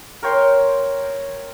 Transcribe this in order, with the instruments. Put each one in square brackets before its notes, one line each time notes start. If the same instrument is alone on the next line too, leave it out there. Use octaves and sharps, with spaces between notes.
[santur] A#4 C#5 G5 C6